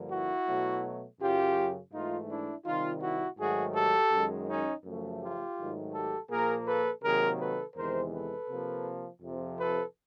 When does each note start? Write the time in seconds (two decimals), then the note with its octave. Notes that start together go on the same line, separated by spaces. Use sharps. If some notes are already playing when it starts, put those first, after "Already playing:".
Already playing: G2 D3 F3 A#3
0.11 E4 F#4
0.47 B2 F#3 A3
1.20 F#2 C#3 F#3 F4 G4
1.92 G#2 E3 A3 D#4 F4
2.29 D4 E4
2.65 C3 D#3 G3 D#4 F4
3.02 E4 F#4
3.38 G#2 D#3 F#3 A3 F#4 G#4
3.74 G4 A4
4.12 F#2 D#3 G#3
4.48 C#4 D#4
4.84 F#2 C#3 F3 A3
5.21 F4 G4
5.58 G#2 D#3 F#3 A3
5.94 G4 A4
6.30 A#2 F3 A#3 G#4 A#4
6.66 A4 B4
7.03 C3 D#3 F#3 A#3 G#4 A#4
7.39 A4 B4
7.75 E2 C3 D#3 G#3 A#4 C5
8.12 A4 B4
8.49 C3 F3 A#3
9.22 F2 C3 F3
9.58 A4 B4